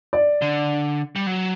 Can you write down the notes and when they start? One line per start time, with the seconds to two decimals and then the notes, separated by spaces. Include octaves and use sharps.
0.13 D5
0.42 D3
1.16 G3
1.27 F#3